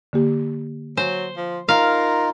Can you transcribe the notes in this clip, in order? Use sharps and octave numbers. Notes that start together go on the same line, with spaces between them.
D3 A#3 G4
F#3 C5 G#5
F3
D#4 F4 A#4 F5